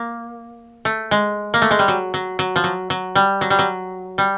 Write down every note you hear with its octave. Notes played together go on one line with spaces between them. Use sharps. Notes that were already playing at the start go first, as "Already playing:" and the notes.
Already playing: A#3
A3
G#3
A#3
A3
G#3
G3
F#3
F#3
F#3
F3
F#3
F#3
G3
F#3
G3
F#3
G3